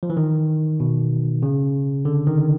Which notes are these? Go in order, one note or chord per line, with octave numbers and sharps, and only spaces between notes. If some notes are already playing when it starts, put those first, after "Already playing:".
F3
E3
D#3
B2
C#3
D3
D#3